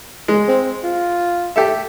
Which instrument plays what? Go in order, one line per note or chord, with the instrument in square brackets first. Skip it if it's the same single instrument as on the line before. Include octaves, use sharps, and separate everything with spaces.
[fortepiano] G#3
[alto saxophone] C4
F4
[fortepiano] G4 A4 E5